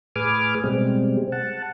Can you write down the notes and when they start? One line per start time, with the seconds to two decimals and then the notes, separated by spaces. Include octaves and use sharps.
0.16 A2 G#4 B4 G#5 D6 F6
0.64 B2 G3 G#3 C4
1.32 F#5 A5